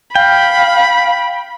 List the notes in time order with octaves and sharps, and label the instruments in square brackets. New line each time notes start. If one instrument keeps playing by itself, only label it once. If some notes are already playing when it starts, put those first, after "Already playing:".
[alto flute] F5 [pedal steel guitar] G5 [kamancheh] B5